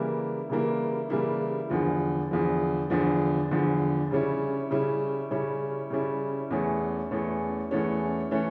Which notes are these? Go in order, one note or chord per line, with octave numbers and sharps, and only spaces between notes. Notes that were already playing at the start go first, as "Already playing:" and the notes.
Already playing: C#3 E3 G3 A#3 E4
C#3 E3 G3 A#3 E4
C#3 E3 G3 A#3 E4
E2 D3 F3
E2 D3 F3
E2 D3 F3
E2 D3 F3
C#3 G3 C#4 E4
C#3 G3 C#4 E4
C#3 G3 C#4 E4
C#3 G3 C#4 E4
E2 E3 A3 C#4
E2 E3 A3 C#4
E2 E3 A3 C#4
E3 A3 C#4